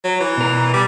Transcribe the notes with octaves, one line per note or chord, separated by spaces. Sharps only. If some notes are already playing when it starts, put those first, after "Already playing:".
F#3
E3
B2 A#4
G3